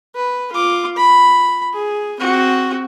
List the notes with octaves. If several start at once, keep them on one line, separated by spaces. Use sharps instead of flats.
B4
F4 D6
B5
G#4
C4 F#4